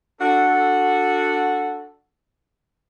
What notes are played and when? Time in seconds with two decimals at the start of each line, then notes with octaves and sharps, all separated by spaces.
0.21 D4 F#4 A4